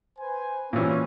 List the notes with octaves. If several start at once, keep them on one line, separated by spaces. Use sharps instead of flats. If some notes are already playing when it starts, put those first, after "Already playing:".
B4 C5 G#5
A#2 E3 G3 C4 C#4